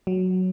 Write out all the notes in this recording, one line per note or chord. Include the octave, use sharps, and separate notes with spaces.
F#3